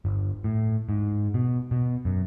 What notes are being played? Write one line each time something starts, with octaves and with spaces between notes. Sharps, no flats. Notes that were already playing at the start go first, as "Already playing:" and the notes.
G1
A2
G#2
B2
B2
F#2